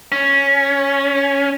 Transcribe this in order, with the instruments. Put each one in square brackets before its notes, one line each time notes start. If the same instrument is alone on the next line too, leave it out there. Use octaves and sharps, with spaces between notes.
[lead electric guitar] C#4